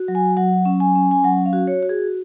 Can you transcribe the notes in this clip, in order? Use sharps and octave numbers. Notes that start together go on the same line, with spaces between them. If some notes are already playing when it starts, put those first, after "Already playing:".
Already playing: F#4
F#3
G#5
F#3 F#5
C#4
G#5
C#4
G#5
F#3 F#5
F5
F#4
C#5
F#4
G#4